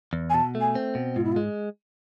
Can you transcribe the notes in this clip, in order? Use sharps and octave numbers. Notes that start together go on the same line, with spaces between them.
E2
G#5
B2 A5
A3
G#5
C4
B2
G#2 F4
E4
F4
G#3